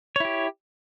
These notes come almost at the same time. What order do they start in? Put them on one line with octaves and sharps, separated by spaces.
C#5 E4 G4